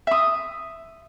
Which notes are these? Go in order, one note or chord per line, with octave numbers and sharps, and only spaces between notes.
E5 D#6